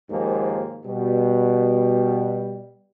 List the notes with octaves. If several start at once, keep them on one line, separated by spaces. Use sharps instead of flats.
D#2 G#2 F3 A#3
B2 G3